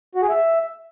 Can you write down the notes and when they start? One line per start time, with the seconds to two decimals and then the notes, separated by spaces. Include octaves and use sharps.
0.15 F#4
0.22 G#4
0.29 E5